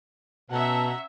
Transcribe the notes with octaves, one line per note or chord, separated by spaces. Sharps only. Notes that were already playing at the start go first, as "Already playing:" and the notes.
B2 B3 C#4 E5 F#5 A5 A#5